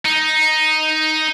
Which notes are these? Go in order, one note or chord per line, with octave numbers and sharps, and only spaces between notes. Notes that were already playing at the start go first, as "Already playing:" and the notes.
D#4